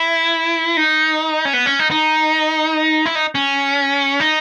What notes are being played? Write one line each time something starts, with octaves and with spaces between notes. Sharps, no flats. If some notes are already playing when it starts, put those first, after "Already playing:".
Already playing: E4
D#4
C#4
B3
C#4
D#4
D#4
E4
D#4
C#4
D#4